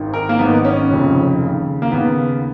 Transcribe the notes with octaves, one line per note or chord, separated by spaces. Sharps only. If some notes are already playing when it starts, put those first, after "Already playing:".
Already playing: G#1 G#2 D#3
A#4
A#3
G#1 G#2 D#3 B3
C#4
F1 F2 C#3
D#2 C#3
A#3
D#2 C#3 B3